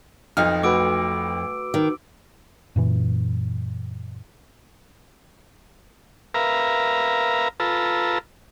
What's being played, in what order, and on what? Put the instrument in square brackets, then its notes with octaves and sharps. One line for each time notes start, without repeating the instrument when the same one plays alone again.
[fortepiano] B1 D#4 F6 [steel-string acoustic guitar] F2
[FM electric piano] A3 F#4 B4 [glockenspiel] D6 E6 D7
[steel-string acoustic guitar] D#3
[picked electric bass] F#2 A#2 E3
[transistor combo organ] A#4 B4 E5 F5 A#5
F4 A4 B4 A#5 E6